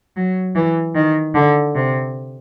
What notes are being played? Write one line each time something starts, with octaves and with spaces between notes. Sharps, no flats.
F#3
E3
D#3
D3
C3